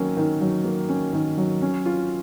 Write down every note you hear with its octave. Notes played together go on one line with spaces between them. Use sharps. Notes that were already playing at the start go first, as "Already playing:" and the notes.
Already playing: D#3 F#3 A#3 C#4
D#3
F#3
A#3
C#4
D#3
F#3
C#4
F4